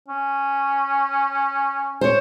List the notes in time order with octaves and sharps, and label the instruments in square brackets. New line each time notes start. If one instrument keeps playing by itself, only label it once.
[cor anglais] C#4
[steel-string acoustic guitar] C5 C#5